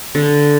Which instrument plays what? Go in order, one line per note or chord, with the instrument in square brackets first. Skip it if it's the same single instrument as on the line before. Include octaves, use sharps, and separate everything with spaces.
[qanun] D3